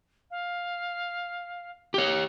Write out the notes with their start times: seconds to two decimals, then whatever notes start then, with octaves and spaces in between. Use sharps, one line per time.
0.31 F5
1.94 G4 C#5